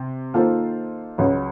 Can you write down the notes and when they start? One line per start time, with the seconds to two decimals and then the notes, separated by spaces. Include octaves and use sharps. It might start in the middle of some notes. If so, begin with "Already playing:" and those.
Already playing: C3
0.34 D#3 A#3 F4 A4 C5
1.18 C#2 C#3 F#3